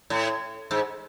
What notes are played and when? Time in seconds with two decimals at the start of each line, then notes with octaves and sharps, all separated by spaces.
0.10 A2
0.71 G#2